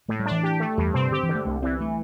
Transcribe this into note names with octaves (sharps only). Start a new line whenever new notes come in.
A2 A3
G3
D4
E3
G4
A3
E2 G2
C3 C4
D3 G4
E3
D3
A3
C2 A3
E3 C4
A3